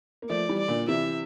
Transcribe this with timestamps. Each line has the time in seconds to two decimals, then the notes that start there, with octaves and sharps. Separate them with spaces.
0.22 A#3
0.30 F3 A3 D5
0.49 E3 G3
0.58 D5
0.68 A#2 D3
0.88 C3 E3 E5